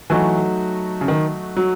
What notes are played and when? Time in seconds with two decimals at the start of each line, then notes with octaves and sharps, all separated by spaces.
0.10 E3 F#3 A3 D#4 F#4
1.01 C#3
1.08 D#3
1.57 F#3